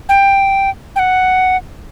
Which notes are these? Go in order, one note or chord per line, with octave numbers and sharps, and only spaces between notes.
G5
G5
F#5